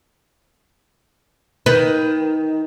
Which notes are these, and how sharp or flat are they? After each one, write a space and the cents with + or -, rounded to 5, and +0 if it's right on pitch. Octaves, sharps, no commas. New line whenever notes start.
D#3 +15 B4 +0